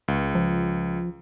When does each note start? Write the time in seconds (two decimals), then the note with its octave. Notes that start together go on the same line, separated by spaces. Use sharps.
0.08 C#2
0.35 F3